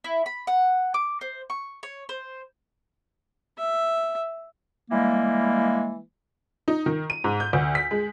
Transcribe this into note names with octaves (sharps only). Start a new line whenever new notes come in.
E4
B5
F#5
D6
C5
C#6
C#5
C5
E5
E3 G3 G#3 A#3
D#4
D#3
D#7
G#2
G6
D2
B6
G#3